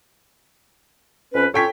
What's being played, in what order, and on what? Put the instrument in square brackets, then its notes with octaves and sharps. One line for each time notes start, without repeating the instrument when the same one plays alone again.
[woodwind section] F2 C#4 B4
[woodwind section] C#4 F4 C#5 [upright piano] A4 G5 B6